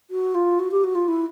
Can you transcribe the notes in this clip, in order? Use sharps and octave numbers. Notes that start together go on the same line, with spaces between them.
F#4
F4
F#4
G4
F#4
F4
E4